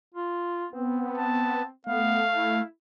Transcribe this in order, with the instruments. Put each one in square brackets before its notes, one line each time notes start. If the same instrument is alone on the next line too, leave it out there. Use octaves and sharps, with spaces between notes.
[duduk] F4
[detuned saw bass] B3 [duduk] C4
[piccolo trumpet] A5
[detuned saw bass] A3 [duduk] B3 [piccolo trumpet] F5
[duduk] E4